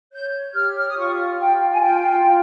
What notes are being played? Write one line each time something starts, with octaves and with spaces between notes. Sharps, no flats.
C#5 G6
G4 F6
F6
D#6
F4 C#6
F4 G5
G#5
F4 G5
F4